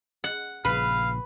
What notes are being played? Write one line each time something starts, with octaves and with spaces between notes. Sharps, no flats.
F#5
A#1 A#2 C#3 B4 F5